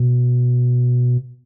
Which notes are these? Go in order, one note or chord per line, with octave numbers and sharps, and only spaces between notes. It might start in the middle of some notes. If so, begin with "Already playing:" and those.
Already playing: B2